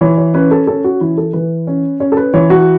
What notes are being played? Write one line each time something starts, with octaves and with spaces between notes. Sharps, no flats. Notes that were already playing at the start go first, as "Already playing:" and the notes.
E3 C#5
C#5
C#4 B4
A4
C#4 A4
F#4
E3 E4
A4
E3 B4
C#4
C#4 C#5
A4
B4
E3 C#5
F#4